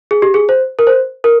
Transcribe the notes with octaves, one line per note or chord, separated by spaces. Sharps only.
G#4
G4
G#4
C5
A#4
C5
A#4